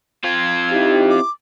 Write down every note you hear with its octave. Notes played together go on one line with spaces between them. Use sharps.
C4 F4 G#6
D#4 E4 G4
D6